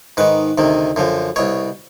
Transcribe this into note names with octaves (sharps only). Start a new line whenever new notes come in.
G#2 D#3 B4
D2 C3 D#3
F#2 D3 F3
C2 B2 C#5